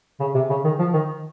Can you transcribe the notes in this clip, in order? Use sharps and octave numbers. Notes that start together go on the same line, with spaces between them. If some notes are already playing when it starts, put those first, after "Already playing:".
C#3
C3
C#3
D#3
F3
D#3